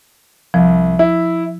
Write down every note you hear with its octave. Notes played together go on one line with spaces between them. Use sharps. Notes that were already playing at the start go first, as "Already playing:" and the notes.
C2 F3
E4